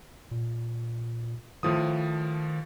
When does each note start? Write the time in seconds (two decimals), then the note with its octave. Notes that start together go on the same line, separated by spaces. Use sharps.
0.31 A#2
1.63 A2 D#3 F3 D#6